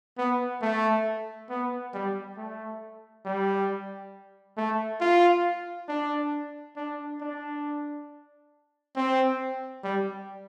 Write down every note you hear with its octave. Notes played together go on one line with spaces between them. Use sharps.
B3
A3
B3
G3
A3
G3
A3
F4
D4
D4
D4
C4
G3